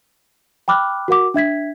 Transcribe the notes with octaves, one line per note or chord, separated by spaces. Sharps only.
G5 B5 D6 F6 F#6
F#4 A#4 F#5 D6
D4 E5 G#6 B6